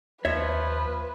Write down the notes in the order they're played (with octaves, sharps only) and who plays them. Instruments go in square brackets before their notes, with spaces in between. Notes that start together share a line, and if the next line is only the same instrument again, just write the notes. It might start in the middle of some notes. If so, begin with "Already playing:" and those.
[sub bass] D#2 [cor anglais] F3 [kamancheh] B4 [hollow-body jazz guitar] C#5 E5